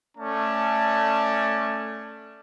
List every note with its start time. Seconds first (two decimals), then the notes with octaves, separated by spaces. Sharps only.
0.18 A3 C#4 D5 A5